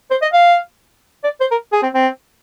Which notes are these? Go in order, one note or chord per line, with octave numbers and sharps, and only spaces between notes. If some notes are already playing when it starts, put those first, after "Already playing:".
C5
D#5
F5
D5
C5
A#4
G#4
C4
C4